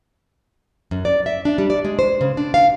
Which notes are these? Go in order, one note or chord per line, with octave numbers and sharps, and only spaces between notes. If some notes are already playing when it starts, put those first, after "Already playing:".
F#2
D5
E5
D4
G3
D5
G#3
C5
C#3
D4
F5